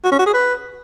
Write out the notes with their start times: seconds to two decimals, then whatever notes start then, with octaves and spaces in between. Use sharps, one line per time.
0.04 F#4
0.11 C#4
0.18 F#4
0.26 G#4
0.33 B4